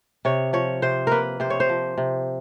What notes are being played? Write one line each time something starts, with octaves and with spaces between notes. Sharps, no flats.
C3 C#5
F3 C#5
C3 C5
A#3 A#4 B4
C3 C5
C#5
C5
F3
C3